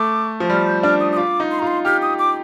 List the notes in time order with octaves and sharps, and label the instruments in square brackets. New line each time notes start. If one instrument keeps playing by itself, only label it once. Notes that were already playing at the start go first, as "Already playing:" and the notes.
Already playing: [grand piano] A3 [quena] D6
[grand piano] F3
[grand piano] G3 [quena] F6
[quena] G6
[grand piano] D4 [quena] F6
[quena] D#6
D#6
[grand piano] F4 [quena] D6
[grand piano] D#4
[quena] C6
[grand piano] F4 [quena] A#5
[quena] C6
[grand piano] G4 [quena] F6
[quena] D#6
D6